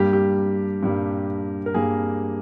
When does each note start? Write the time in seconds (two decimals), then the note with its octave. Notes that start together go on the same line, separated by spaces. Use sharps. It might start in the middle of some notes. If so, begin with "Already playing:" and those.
Already playing: G2 G3 A#3 G4
0.13 G4
0.83 G2 G3 A#3
1.66 A#4
1.74 G2 G3 A#3 G#4